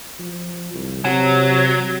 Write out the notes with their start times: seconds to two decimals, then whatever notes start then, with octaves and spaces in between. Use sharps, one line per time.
0.19 F3
0.74 C2
1.05 C3 F#3